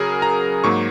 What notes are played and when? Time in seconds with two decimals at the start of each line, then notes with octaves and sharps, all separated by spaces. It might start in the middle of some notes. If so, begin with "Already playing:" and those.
Already playing: C#3 F#3 G#4 A#4
0.22 A#5
0.64 G#2 F#3 A#3 C#6